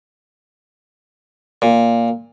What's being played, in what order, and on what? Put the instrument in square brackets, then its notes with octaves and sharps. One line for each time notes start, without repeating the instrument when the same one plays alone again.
[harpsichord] A#2